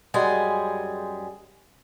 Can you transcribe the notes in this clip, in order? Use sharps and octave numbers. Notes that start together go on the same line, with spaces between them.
F#2 G3 G#3 G#4 G#5